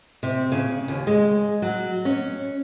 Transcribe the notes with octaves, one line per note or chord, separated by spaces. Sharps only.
C3
C#3
D#2
G#3
F#3
C#4